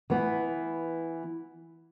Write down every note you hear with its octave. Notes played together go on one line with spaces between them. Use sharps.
E3 B3